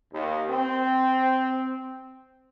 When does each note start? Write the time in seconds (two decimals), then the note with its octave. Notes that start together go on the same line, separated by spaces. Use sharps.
0.13 D#2
0.50 C4